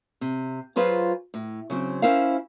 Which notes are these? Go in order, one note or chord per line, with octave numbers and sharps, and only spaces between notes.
C3
F#3 F4 G#4 B4 C5 F5
A2
C#3 F#3 C4
C#4 E4 A#4 C5 F5